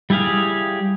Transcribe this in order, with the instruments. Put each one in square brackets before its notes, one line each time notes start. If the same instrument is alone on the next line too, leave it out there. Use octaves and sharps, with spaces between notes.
[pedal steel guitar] G3 E4 G4 G#4 F5